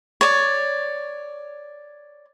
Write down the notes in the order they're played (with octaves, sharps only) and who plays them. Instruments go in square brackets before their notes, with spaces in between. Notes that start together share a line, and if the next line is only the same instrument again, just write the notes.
[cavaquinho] C#5 D5